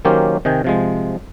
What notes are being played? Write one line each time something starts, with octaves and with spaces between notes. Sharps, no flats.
D#3 F#3 A#3 C#4 G4 C5
C3 D#3 D#5 G5 G#5
C3 F3 G#3